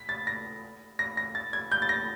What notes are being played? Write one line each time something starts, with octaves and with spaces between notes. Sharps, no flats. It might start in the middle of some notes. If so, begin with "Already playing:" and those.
Already playing: B6
A6
A#6
A#6
A#6
A6
G#6
G6
A6
A#6